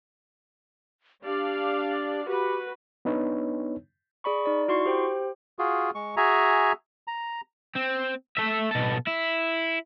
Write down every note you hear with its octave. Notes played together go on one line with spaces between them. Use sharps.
D4 G4 D5 F5
F#4 G4 B4
B3 D4 D#4 B4 C#5
G#4 D5 B5 C#6
D#4 D5
E4 F#4 C6 C#6
G4 C5 G5
F4 F#4 G#4
G#3 C#6
F#4 G#4 E5 G#5 A#5
A#5
C4
A3 E5
B2 A4
E4